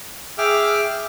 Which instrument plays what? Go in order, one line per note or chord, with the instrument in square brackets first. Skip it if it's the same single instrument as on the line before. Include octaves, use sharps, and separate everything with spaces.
[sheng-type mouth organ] G#4 E5 G5 D6 F6